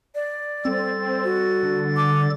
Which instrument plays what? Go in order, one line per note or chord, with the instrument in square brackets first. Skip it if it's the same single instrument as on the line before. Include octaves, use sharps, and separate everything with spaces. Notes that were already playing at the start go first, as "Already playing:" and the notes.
[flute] D5
[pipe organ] G3 A4 A6 [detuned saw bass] C4
[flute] F#4
[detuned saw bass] D3
[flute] D6